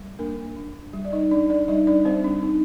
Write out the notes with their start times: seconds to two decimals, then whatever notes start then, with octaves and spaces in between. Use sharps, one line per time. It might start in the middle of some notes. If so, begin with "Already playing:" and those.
Already playing: G3
0.19 A#3 D4 A#4
0.57 D4
0.93 G3
1.05 D5
1.12 D#4 D#5
1.31 D4 D5
1.50 D4 D5
1.68 G3 D#4 D#5
1.87 D4 D5
2.05 G3 C4 C5
2.24 D4
2.43 C4 D#4